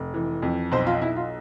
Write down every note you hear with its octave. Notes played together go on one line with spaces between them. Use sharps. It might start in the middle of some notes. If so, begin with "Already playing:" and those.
Already playing: F1
E3
F2
B1 C5
F4
B1 E4
F4